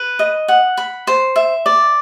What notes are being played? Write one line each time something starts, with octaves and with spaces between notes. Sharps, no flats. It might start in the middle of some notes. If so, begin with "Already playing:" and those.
Already playing: B4
D#5
F#5
B5
C5
E5
D5